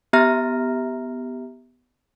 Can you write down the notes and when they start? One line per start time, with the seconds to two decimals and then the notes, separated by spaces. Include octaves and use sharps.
0.13 B3 G4 E5 A#5 F6 A#6